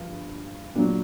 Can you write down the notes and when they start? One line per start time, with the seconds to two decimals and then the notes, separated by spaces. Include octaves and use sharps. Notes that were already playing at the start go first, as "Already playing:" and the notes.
Already playing: G2 D3 F3
0.75 A#2 D4
0.79 F#3